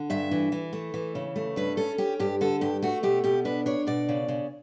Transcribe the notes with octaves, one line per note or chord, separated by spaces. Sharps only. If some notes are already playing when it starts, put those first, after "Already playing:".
Already playing: D3
G2 E5
E3
E3
A3
E3
C#3
A3
G2 B4
C#4 A4
C#4 G4
G2 G4
D3 A4
G2 G4
A3 F#4
B2 G4
B2 G4
D4 B4
D4 C#5
B2 D5
C#3
C#3